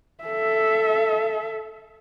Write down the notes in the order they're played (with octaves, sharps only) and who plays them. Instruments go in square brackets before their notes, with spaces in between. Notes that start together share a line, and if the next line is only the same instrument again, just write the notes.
[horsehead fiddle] A4 E5